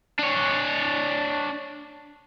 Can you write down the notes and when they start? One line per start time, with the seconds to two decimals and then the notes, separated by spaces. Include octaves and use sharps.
0.19 D4 C#5